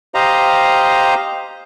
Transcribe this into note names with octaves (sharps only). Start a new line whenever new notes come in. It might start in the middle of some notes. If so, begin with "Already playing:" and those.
G4 C5 D#5 F5 A#5